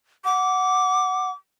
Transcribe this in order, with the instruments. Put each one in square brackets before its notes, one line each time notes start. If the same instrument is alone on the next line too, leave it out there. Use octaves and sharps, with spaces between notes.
[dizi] F#5 [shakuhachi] D6